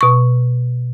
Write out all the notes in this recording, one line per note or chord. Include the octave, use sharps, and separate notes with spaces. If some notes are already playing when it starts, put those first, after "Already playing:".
B2 C#6